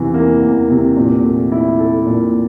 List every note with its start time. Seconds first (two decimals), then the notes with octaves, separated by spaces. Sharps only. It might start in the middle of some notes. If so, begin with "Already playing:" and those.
Already playing: E2 C3 E3
0.14 A#3
0.42 E2
0.70 C3
0.97 A#2
1.24 A3
1.52 E4
1.79 A4
2.06 A#2